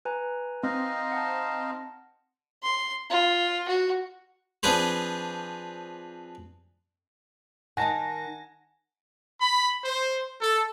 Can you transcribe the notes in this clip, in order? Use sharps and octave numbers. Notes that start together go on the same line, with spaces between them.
B4 G#5 A#5
C4 D#4 D#5 F5
F#5 A5
C6
F4
F#4
F3 C4 D4 G#4 B4 C5
D#3 D#4 F#5 G#5 A5 A#6
B5
C5
A4